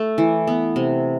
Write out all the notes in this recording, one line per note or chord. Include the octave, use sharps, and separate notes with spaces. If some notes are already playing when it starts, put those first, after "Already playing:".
Already playing: A3
E3
B3
C3